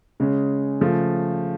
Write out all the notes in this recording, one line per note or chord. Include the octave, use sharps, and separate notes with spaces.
C#3 G#3 C#4
C#3 F3 A3